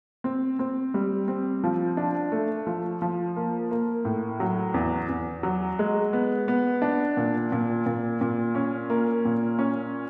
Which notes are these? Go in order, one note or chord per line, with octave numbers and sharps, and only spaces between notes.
C4
C4
G3
C4
F3
D4
A3
F3
F3
A#3
A#3
A2
F#3
E2
E2
F#3
G#3
B3
B3
D4
A#2
A#2
A#2
A#2
C#4
A#3
A#2
C#4